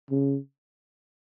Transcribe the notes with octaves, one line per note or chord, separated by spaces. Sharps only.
C#3